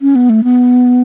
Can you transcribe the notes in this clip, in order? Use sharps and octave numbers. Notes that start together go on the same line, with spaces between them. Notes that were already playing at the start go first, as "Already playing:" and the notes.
C#4
B3
A3
B3